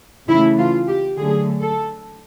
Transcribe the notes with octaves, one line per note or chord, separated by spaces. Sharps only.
C#3 E3 A3 E4
F4
G4
D3 F#3 A3 G#4
A4